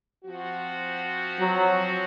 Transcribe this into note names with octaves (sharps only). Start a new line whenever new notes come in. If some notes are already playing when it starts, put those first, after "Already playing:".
F3 C4 F#4
F#3